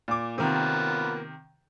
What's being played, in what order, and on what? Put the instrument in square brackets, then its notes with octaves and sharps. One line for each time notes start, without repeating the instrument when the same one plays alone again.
[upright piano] A#2 D6
[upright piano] C3 D#3 [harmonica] A#3 B3 F4